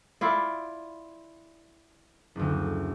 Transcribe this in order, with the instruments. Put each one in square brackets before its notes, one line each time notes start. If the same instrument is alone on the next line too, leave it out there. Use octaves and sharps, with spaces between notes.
[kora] E4 F4 D5
[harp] F#1 D2